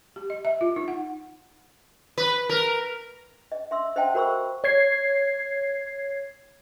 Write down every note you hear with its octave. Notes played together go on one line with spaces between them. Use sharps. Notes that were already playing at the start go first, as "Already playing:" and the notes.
G4
D#5
E5
F4
D#4
F#5
B4
A#4
D#5
E5 C6 E6
C5 D#5 E5 F#5 G5 A5
F#4 A#4 C5 B5 C#6 E6
A#4
C#5 G#6 C7